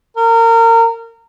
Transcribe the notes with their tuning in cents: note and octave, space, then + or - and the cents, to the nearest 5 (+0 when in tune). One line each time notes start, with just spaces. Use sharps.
A#4 -30